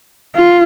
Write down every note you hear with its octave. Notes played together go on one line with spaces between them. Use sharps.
F4